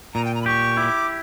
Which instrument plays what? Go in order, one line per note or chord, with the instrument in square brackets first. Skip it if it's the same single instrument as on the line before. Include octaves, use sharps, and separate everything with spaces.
[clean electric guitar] A#2 [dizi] A#5
[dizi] G5
A#5
B5
[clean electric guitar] G4 [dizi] C#6
[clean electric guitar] E4 [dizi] D6